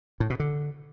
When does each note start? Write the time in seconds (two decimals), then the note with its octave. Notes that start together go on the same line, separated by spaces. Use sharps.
0.20 A2
0.30 B2
0.40 D3